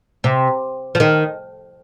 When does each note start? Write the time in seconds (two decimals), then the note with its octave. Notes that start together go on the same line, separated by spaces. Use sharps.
0.24 C3
0.95 F3
1.00 D#3